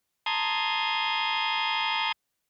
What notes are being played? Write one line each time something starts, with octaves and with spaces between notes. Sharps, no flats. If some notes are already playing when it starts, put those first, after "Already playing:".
A5 A#5 C6 D#6 G#6